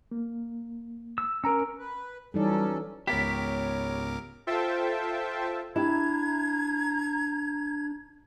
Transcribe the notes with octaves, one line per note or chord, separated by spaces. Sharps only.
A#3
E6
C#4 A#4 A#5 E6
B4
E3 F#3 G3 C#4 D#4 A4 D5
C#2 G#2 B3 G4 A#4 C#5 D6 B6
F4 A4 C5 E5 G5 A5
D4 E4 G4 A#5 G#6